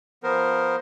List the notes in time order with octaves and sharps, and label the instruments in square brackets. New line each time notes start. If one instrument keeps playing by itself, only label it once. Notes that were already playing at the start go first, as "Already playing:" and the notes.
[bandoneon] F3 B3 A#4 C5